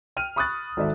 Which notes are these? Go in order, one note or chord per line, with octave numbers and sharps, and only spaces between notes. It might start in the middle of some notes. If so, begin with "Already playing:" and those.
G5 F6 D#7
B5 C#6 D#6 F6 F#6 A6
G#1 A4 D5 E5